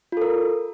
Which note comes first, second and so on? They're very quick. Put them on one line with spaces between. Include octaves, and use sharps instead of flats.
F4 A4 A#4